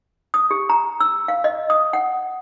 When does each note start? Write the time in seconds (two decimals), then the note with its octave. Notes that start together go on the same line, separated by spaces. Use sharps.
0.34 D#6
0.51 G4
0.70 A#5
1.00 E6
1.28 F5
1.44 D#5
1.70 D#6
1.93 F#5